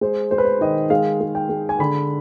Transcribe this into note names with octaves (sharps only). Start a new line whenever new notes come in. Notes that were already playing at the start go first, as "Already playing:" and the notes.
G#3 C5
G#3 C5
B4
C5
D#3 D#5
G#3 F5
G#3
G5
G#3
G#5
D3 B5